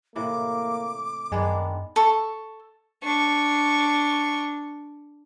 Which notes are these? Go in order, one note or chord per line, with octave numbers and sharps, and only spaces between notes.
A2 C3 E3 A#3 D6
F#2 D#3 G#3 B3 D4 G#5
A4 C#6
D4 C#6